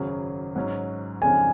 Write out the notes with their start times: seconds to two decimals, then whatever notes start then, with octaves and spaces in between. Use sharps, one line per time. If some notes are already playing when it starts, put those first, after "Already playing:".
Already playing: G#1 F#2 C#3 F#3
0.55 G#2 F#3 C#4
1.22 F2 C#3 G#3 G#5